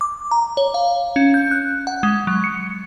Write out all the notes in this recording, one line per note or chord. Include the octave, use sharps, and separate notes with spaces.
D6
A#5
C#5
F5
C#4
G6
F#6
F#5
G#3
F#3
C#7